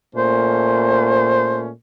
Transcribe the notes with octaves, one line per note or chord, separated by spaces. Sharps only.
A#2 A3 C#4 C5